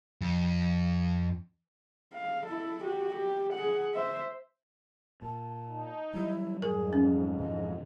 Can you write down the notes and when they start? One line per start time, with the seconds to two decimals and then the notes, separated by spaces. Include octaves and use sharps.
0.21 F2
2.14 F5
2.47 E4 A4
2.84 F#4 G4
3.15 G4
3.54 G#4 F#5
3.94 C5 E5
5.22 A#2 A5
5.68 D#4
6.13 E3 F#3 G3 E4
6.62 F2 G#2 G#4 A#4
6.93 C#4
7.39 B2 D#3 E3 D#5